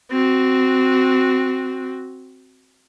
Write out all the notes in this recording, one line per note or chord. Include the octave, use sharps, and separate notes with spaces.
C4 F#4